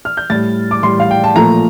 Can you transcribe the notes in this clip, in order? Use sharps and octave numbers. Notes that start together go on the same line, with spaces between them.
F6
G6
A2 G3 A6
D6
A2 G3 C6
F5
G5
A5
A#2 F3 A3 A#5